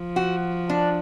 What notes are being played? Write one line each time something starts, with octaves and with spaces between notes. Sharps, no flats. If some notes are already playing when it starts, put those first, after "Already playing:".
Already playing: F3
F#4
D4